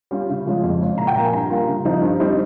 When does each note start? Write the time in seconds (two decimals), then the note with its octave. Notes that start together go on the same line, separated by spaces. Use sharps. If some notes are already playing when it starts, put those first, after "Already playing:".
0.11 G3 C#4 F4
0.29 C#3
0.46 F3 G#3 C#4 F4
0.64 F2
0.81 C#3 G#3 C#4 F4
0.98 A#2 A#5
1.07 G5
1.15 F3 A#3 F4 A#5
1.24 G#5
1.33 G2 A#5
1.50 G3 A#3 F4
1.67 C#3
1.85 F3 C4 D#4
2.02 G2
2.20 G3 C4 D#4